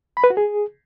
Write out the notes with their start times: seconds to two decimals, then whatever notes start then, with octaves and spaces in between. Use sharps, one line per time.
0.17 B5
0.24 B4
0.30 F#4
0.37 G#4